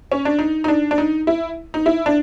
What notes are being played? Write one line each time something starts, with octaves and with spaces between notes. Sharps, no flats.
C#4
D4
D#4
D#4
D4
D4
D#4
E4
D#4
E4
D4